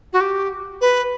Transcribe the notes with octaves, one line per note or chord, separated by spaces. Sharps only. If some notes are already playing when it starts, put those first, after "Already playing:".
F#4
G4
B4